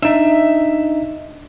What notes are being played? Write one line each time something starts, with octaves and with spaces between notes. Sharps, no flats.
D4 D#4 E5